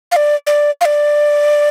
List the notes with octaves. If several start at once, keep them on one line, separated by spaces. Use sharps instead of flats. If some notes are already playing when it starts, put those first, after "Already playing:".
F5
D5
D5
F5
D5